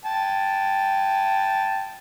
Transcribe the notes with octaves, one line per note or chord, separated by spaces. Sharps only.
G5 A5